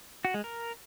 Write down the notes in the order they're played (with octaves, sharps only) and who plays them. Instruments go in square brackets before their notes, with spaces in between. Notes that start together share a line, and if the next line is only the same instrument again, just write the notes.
[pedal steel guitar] F#4
G#3
A#4